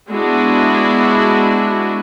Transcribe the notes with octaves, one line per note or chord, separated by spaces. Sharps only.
G#3 B3 D4 E4 F#4